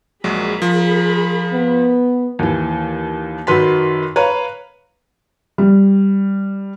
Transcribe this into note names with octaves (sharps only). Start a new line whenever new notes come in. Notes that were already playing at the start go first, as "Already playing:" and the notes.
A#1 F#3 G#3 G#4 A#4 B5
F3
B3
D#2 E3
F#2 D#3 F#3 B4 C6 B6
B4 C#5 F5 A#5
G3